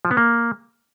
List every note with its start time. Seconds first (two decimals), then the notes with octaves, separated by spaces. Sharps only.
0.05 F3
0.11 B3
0.17 A#3